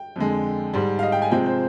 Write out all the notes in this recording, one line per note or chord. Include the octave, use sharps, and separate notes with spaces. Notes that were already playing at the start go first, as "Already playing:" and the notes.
Already playing: G5
F2 D3 G#3
G#2 G3
F5
D#5
G5
G#5
C3 F3 G#3 G5
C5